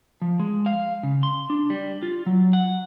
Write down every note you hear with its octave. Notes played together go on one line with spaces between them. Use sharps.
F3
G#3
F5
C#3
C6
D4
G3
F4
F#3
F#5